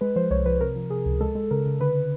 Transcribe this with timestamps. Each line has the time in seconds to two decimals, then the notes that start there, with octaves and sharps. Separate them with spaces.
0.01 G#3 B4
0.16 F3 C5
0.30 C2 C#5
0.45 F3 B4
0.61 C3 A#4
0.76 F3
0.90 C3 G#4
1.06 C#2
1.21 G#3 A4
1.35 G#3
1.51 C#3 A#4
1.66 C#3
1.80 D3 B4